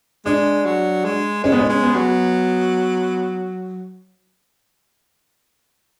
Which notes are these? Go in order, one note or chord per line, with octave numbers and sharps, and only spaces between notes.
G#3 D4
F#3
G#3
G#3 C#4
B3
C#4
G#3
B3
F#3